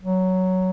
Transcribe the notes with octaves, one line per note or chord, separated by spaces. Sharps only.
F#3